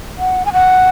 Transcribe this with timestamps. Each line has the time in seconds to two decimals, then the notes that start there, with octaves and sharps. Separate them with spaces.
0.18 F#5
0.46 G#5
0.53 F#5